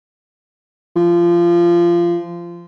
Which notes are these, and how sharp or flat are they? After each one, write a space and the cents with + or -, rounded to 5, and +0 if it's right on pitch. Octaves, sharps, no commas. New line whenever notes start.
F3 -20